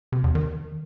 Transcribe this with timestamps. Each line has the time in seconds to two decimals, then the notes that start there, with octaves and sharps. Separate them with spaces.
0.12 C3
0.24 E2
0.35 D#3